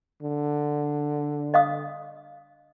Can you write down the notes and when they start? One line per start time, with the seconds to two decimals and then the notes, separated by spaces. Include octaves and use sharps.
0.22 D3
1.54 D#5 F5 D#6